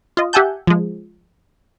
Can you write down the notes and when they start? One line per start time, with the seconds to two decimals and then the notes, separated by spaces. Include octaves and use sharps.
0.17 F4 D#5
0.33 G4 E5 F#5 G#5 A5 G6
0.67 F3 G#3